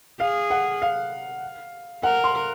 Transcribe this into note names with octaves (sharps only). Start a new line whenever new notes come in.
G#4 F5
F#5
F5
A#4 F#5
C6